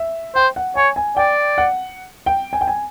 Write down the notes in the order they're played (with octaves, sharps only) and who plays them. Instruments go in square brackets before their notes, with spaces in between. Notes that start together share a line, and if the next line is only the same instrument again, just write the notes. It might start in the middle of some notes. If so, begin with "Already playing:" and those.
Already playing: [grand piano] E5
[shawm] C5 [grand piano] G5
[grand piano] F#5
[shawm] C#5 [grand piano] G#5
[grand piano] G#5
[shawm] D5 [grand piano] G5
[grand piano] F#5
G5
G#5
G5
G#5